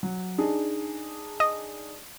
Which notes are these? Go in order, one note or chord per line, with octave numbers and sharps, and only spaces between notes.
F#3
D4 D#4 G#4
D#5